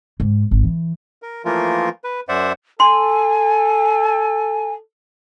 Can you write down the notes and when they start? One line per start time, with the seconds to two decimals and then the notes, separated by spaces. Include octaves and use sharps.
0.20 G#2
0.51 G#1
0.64 E3
1.22 A#4
1.45 E3 F3 A3 A#3 F4 A#4
2.04 B4
2.29 F#2 C5 D5 E5 F#5
2.80 A4 G#5 C6